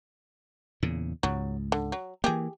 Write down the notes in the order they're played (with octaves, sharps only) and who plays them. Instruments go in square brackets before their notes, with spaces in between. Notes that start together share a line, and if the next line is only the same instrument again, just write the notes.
[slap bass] E2 A#2 C#3
[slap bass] C#2 G#2 [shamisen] F#3
[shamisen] D3
F#3
[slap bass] E3 A#3 [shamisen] G4 G#4